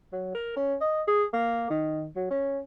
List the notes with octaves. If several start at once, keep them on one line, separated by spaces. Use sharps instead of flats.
F#3
A#4
C#4
D#5
G#4
A#3
D#3
F#3
C#4